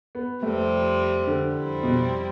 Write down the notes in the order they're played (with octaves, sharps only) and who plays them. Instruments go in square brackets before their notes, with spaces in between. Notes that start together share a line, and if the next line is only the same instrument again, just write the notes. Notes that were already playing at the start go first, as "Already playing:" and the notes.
[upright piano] B3
[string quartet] F2 C3 G3 C4 [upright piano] A3
[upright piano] D3
[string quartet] F2 C3 G3 C4 E4
[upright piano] B2